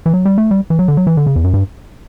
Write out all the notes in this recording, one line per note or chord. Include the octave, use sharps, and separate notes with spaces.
E3
F#3
G3
A3
G3
E3
F#3
D3
F#3
E3
D3
C#3
E2
F#2
G2